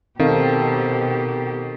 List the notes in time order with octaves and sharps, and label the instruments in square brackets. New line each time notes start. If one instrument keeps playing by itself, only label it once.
[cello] B2 G4 [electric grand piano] D#3 [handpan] C4 A4 F5